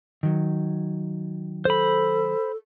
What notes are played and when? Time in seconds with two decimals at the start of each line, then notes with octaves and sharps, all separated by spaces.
0.23 D#3 F#3
1.65 A4 C5 B5